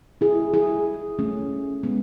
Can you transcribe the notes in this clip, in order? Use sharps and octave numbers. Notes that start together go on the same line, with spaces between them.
E4 G#4
E4 G#4
A3 C#4
G#3 B3